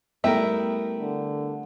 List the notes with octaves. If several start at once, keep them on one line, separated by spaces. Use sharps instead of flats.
G3 A3 B3 E4 A#4 E5 G5
D3